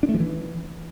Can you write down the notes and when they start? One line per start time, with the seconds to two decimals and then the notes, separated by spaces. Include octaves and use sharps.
0.03 D4
0.09 A3
0.14 F3
0.20 E3